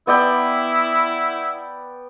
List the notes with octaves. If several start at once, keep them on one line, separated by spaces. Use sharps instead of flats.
B3 E4 D5 G5